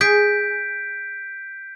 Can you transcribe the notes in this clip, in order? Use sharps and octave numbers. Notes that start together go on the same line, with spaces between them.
G#4 G6 B6 D7